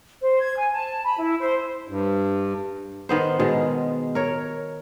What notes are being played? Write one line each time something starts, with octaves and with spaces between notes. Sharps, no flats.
C5
G#6
G#5
A5
B5
E4
C5
G2
D#3 B3 C5
B2 D#3 G#3
A#4 C#5